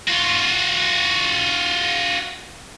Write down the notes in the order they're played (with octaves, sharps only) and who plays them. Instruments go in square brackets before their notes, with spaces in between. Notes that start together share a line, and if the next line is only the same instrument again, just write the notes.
[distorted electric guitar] F4 F#4